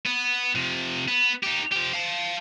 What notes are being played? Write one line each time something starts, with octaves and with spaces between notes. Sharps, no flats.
B3
C3 F3
B3
D#4 G4
F3 G4
F5 A5